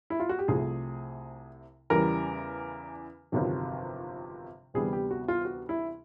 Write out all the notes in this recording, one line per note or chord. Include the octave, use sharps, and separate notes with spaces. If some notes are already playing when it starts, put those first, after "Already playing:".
E4
F4
F#4
G4
C2 C3 F3 A3 G#4
E2 C#3 E3 G3 A#4
G1 F2 C3 D#3 F#3
D2 C3 E3 G3 B3 G#4
G4
F#4
F4
F#4
E4